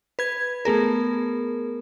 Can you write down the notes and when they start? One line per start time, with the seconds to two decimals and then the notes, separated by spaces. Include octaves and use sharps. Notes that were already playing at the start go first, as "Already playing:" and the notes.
0.19 B4 G#6
0.65 A3 B3 G#4 A#4